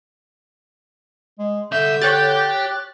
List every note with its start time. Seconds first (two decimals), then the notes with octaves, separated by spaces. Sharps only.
1.39 G#3
1.72 C2 D3 E5 G6
2.02 G4 C#5 G5 F#6 A6